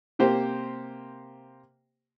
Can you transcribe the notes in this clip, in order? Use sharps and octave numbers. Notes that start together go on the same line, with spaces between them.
C3 A#3 G4 C5